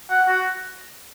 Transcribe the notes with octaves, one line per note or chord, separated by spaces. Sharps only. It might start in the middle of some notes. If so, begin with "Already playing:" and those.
F#5
F#4